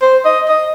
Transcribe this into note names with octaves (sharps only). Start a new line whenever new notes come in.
C5
D#5
D#5